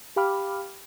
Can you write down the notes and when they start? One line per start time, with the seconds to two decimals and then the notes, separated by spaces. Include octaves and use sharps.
0.16 G4 F5 G5 B5 D6 F6